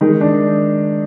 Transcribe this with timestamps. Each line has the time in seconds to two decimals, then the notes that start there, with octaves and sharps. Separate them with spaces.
0.01 D#3 G#3 D#4
0.21 D4